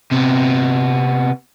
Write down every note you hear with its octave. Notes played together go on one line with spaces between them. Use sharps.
C3 B3